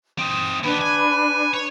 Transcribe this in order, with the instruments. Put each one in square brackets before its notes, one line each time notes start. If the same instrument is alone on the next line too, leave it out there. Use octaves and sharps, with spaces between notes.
[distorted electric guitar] C4 D#4 [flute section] D#6
[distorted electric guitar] D#2 B3 [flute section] D4 B4 B5
[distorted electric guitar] G#5
C#5